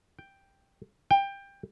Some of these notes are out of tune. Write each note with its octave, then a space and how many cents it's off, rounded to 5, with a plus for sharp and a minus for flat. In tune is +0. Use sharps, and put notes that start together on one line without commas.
G5 +5
G5 +20